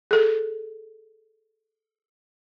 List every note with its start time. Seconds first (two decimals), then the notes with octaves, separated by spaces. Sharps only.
0.11 G#4 A4